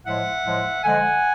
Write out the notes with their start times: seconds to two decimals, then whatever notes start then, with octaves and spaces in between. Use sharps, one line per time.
0.06 A2 F3 G#3 E5 F#5
0.45 A2 F3 G#3
0.83 D3 F3 G#3 F#5 G#5